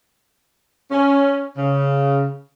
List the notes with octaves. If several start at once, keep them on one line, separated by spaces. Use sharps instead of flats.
C#4
C#3